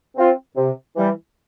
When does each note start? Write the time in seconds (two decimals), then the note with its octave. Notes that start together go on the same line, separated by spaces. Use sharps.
0.16 C4 F4
0.56 C3
0.95 E3 G3